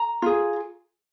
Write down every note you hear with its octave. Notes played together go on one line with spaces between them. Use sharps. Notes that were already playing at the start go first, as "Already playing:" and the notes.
Already playing: A#5
F4 G#4